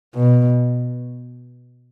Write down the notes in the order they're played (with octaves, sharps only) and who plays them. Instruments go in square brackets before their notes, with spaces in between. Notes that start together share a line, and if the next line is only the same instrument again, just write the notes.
[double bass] B2